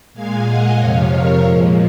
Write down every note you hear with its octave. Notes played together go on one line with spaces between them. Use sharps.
A#2 G#3 F5 G#5
D#5 F#5
F2 C3 F3 C#5 F5
A#4 C#5
A#2 F3 G#3